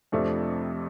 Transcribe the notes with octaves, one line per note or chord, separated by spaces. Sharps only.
F2 C3 F3 A3 D4